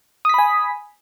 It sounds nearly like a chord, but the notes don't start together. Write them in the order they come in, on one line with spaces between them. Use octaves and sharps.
D#6 B6 B5 G#5